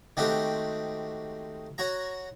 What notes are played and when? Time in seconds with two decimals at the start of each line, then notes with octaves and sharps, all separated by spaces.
0.17 D#3 G#3 A3 C4 F#4 G4
1.78 F#4 C#5 A#5